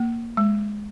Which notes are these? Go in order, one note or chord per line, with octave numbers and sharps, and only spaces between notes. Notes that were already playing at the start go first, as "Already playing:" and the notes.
Already playing: A#3
G#3